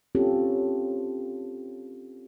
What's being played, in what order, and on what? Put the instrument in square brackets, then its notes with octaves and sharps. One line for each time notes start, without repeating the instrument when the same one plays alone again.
[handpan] C4 C#4 F4 G4 A4